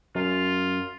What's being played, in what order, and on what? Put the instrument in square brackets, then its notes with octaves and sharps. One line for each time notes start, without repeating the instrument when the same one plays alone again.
[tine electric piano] F#2 [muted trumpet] F4